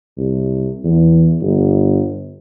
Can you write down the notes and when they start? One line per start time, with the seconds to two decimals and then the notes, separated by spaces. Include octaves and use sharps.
0.17 C2
0.84 E2
1.41 G1